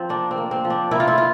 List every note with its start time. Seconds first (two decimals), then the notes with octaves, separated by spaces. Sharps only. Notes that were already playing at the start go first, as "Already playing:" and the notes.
Already playing: F3 C4
0.09 A#3 D4
0.31 C4
0.38 A#3
0.51 C4
0.65 F3
0.70 D4
0.91 A#3 E4
1.00 F4
1.08 E4
1.18 F4